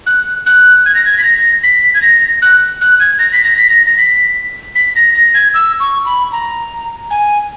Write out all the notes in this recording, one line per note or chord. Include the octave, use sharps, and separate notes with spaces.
F#6
F#6
G#6
A#6
G#6
B6
A#6
B6
G#6
A#6
F#6
F#6
G#6
A#6
B6
A#6
B6
A#6
A#6
B6
B6
A#6
A#6
G#6
E6
C#6
B5
A#5
G#5